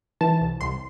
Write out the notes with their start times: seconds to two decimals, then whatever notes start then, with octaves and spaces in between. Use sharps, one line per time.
0.21 E3 A5
0.41 C2
0.61 C2 C6